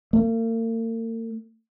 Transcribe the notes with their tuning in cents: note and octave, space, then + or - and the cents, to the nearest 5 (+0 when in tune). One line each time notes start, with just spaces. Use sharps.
A#3 -45